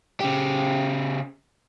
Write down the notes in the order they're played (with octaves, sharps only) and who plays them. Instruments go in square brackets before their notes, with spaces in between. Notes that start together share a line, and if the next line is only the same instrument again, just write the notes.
[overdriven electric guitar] C#3 G4